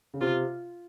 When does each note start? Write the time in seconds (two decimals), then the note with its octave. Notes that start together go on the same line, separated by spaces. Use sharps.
0.14 C#3
0.21 C3 F4